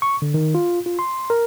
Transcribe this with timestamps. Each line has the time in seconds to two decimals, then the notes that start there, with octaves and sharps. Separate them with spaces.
0.02 C#6
0.22 D3
0.34 D#3
0.55 F4
0.86 F4
0.99 C6
1.30 A#4